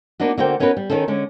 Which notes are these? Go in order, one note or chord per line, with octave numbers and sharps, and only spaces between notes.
A#3 B3 D4 D#4 F#4
D3 A#3 F#4 C5 G5
B3 C#4 D#4 F#4 A#4 B4
G3
D#3 C#4 D#4 G#4 A4
D3 G#3 C#4